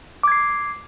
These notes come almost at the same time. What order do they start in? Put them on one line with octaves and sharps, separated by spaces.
D6 G#6 C7